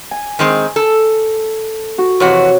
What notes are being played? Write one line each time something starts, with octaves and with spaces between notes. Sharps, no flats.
G#5
D#3 G#3 C4
A4
F#4
F2 C3 E3 F#4 C#5